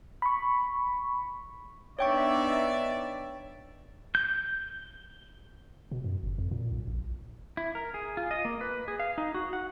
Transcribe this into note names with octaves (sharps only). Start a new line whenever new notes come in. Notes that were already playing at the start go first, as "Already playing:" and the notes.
B5 C#6
B3 D4 D#4 C#5 D5 E5 G5 C#6
G6
B2
F#2
G1
F2
A#2
B1
A#1
E4
A#4
G#4
F4
D#5
A#3
B4
G#4
F5
D#4
F#4
F#5